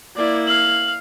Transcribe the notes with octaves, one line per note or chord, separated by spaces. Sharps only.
A#3 E4 D5
F5 F#7